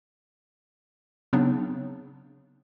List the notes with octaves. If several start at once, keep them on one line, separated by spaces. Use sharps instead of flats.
C#3 F#3 B3 C4 D4 D#4